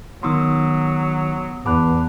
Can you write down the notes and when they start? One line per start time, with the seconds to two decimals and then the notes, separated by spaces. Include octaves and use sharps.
0.23 D#3 F#3 B3 D#4 C6 D#6 E6
1.66 E2 F#5 A5 B5 D6 F#6